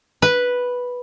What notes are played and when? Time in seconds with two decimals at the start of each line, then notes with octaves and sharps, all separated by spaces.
0.22 B4